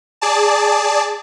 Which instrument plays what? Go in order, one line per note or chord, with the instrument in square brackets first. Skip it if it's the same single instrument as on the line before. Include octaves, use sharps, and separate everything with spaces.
[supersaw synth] G#4 D5 A5